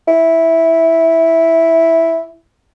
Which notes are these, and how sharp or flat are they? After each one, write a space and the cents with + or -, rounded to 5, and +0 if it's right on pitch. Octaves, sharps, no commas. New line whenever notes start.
E4 -5